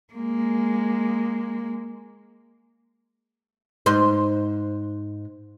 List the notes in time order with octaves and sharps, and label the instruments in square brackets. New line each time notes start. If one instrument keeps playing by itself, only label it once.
[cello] G#3 A#3
[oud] G#2 C5